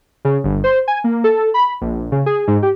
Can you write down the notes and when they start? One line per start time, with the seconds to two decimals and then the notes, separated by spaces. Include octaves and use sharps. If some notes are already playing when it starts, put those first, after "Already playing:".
0.25 C#3
0.44 G1
0.64 C5
0.88 G#5
1.04 A#3
1.24 A4
1.54 B5
1.81 A#1
2.12 C#3
2.26 G#4
2.48 G#2
2.62 G4